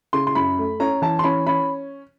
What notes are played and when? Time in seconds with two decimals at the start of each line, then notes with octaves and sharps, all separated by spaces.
0.13 C#3 C6
0.27 C6
0.35 F#2 B5
0.58 A3
0.80 C#4 A#5
1.02 E3 A5
1.19 C6
1.24 C#4 B5
1.47 C#4 B5